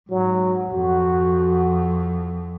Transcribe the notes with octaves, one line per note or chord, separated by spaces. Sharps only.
G#2 F#3
F2 F#4